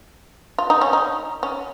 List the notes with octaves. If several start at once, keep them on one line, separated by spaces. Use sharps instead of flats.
F4
D#4
C#4
D#4
C#4